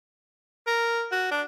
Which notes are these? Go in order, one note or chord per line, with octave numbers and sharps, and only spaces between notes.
A#4
F#4
D4